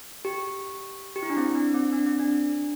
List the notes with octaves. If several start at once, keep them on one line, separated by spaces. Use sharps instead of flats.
G4
G4
E4
D4
C4
D4
C4
D4
C4
D4